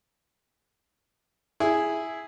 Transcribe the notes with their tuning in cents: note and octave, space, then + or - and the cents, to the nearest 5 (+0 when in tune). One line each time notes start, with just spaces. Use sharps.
E4 +0 G#4 +0 E5 +0